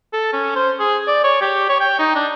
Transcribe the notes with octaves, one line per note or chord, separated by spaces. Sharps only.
A4
C#4
C5
G#4
D5
C#5
G4
C#5
G5
D#4
D4